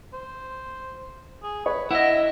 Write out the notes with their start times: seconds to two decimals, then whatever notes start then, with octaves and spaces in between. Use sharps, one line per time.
0.14 C5
1.43 G#4
1.66 B4 C#5
1.91 E4 D#5 E5 F#5 E6